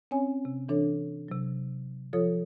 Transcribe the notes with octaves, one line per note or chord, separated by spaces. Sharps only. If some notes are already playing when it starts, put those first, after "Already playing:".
C4 C#4 C#5 G#5
C3
E3 D4 A4 C#5
C3 F#3
F3 F4 A4 C#5 D#6